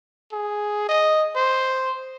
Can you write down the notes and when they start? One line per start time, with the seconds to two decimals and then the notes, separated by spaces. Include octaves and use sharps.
0.32 G#4
0.89 D#5
1.36 C5